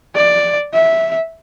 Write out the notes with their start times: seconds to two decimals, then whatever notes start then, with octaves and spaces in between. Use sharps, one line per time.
0.15 D5
0.74 E5